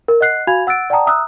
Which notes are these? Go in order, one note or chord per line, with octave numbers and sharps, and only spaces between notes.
A#4
D#5 F#5 F#6 C7
F#4 F5 G#5 B5 G#6 F7
F#5 E6 F#6 A6 D7
D5 F#5 G5 A5 A#5 D#6
E5 A#5 D#6 E6 F#6